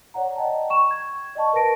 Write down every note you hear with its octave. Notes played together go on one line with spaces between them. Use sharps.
C#5 D5 F#5 A#5
D5 D#5 F#5 G5 A5 A#5
G5 C#6 E7
G#6
D5 D#5 G5 A5 C#6
A#4 B4 A5 A#6 D7